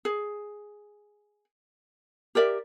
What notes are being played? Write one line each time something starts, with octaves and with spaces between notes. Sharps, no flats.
G#4
G4 A#4 D5 E5